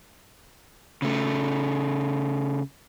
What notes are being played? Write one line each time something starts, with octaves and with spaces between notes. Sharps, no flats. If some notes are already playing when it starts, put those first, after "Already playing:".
C#3 A3